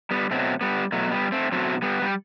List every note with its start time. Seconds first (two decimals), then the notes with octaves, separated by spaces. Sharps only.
0.11 G3 B3
0.31 B2 F#3 A3 C4
0.61 G3 B3
0.92 B2 F#3 A3
1.12 G3 B3
1.32 A3 C4
1.52 B2 F#3 A3 C4
1.82 G3 B3
2.02 G3